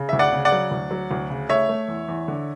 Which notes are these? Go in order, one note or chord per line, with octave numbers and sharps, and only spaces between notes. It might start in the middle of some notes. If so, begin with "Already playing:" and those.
Already playing: C#3
D2 E5
D5 F#5
C#3
D5 F#5
F#3
D2
F#3
D2
C#3
A3 C#5 E5
A3
E2
E2
D3